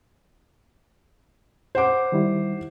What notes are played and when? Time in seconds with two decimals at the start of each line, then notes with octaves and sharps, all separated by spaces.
1.75 C5 F#5 D6
2.12 D#3 G3 E4